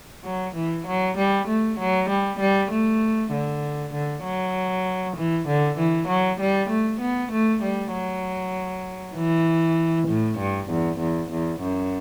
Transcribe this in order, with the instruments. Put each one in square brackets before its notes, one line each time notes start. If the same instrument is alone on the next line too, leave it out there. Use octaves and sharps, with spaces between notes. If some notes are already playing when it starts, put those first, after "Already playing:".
[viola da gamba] F#3
E3
F#3
G3
A3
F#3
G3
G3
A3
D3
D3
F#3
E3
D3
E3
F#3
G3
A3
B3
A3
G3
F#3
E3
A2
G2
E2
E2
E2
F#2